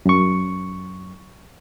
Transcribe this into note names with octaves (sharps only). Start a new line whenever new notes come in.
F#2 C#6